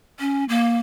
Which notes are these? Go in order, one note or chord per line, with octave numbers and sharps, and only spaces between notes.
C#4
A#3